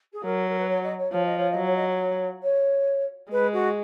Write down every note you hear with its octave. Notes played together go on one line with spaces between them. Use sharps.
G#4
F#3 A#4
A#4
B4
C#5
D#5
C#5
F3 C#5
D#5
C#5
D#5
F#3
C#5
D#5
C#5
C#5
G#3 B4
F#4